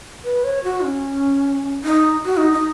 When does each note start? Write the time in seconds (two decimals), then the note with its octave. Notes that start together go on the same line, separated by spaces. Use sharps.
0.24 B4
0.44 C#5
0.64 F#4
0.84 C#4
1.84 D#4
2.25 F#4
2.37 D#4
2.53 D#4